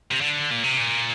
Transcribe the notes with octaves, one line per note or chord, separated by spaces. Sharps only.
C3
D3
A#2
C3
A#2